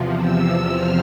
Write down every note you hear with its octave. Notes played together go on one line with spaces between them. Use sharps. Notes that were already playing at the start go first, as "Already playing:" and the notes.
Already playing: E2 C3 F3
E6
F6